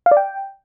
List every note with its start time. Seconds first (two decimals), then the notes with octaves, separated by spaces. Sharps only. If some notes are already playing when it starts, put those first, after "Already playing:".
0.06 F5
0.11 D5
0.17 G5